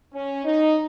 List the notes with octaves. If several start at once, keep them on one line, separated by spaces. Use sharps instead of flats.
C#4
D#4